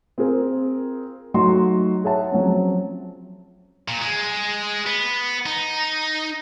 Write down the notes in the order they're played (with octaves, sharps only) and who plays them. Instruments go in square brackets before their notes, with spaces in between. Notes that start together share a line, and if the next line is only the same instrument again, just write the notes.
[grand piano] C4 F4 G#4 A#4
F#3 A3 D#4 F#4 C6
G#4 C#5 E5 F#5 A5
F3 F#3 C4 C#4
[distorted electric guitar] A#2
G#3
B3
D#4